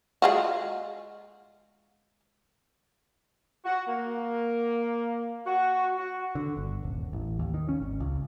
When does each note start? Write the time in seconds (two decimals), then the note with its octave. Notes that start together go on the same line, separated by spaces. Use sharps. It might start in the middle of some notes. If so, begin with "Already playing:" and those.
0.22 G#3 F4 F#4
3.64 F#4
3.86 A#3
5.45 F#4
5.97 F#4
6.35 D3
6.57 G1
6.83 D#1
7.13 A1
7.39 D#2
7.54 D#3
7.69 C#4
7.80 G#1
8.00 C#2